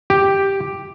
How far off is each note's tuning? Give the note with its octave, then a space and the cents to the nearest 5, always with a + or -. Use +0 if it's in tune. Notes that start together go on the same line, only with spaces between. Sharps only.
G4 +0